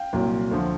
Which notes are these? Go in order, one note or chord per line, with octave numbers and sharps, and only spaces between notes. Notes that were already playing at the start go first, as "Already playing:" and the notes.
Already playing: F5 G5
C2 A#2 F#3
D2 D3 F3 A3